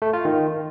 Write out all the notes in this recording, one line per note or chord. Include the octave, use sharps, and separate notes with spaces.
A3
F4
D#3